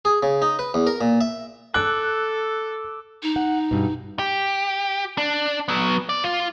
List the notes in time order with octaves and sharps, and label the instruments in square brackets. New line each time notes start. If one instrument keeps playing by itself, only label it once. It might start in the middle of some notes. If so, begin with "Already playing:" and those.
[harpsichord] G#4
C#3
D#4
B4
E2
A#4
A#2
E5
[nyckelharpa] A4 [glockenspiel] D6 E6 D7 [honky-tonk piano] F#6
[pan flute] D#4
[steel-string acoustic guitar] F#5
G2 B2
[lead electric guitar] G4
D4
F#3 B3
D5
F4